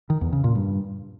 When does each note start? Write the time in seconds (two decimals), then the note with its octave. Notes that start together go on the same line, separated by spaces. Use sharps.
0.10 D#3
0.21 E2
0.33 C#3
0.44 A#2
0.55 G2